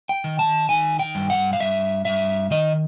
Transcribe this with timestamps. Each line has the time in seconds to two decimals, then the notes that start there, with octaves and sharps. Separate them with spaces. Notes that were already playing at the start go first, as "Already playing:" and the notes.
0.09 G5
0.24 D#3
0.39 A5
0.69 D#3 G#5
0.99 G5
1.15 G2
1.30 F#5
1.53 F5
1.60 G2 E5
2.05 G2 E5
2.51 D#3 D#5